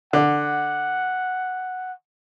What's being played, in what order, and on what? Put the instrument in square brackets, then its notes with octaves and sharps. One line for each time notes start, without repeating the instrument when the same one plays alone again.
[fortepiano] D3 [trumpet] F#5